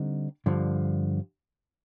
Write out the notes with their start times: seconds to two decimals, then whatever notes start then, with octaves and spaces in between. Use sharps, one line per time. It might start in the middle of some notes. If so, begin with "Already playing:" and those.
Already playing: D3 G3 C4 D#4
0.46 G2 D3 F3